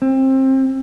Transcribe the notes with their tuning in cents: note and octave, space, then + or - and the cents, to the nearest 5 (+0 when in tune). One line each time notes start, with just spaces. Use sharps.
C4 +25